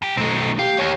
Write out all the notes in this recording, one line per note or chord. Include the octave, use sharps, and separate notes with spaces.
F#2 G4
B1 A3 C4 D#4
G4 F5
D#2 G4 C#5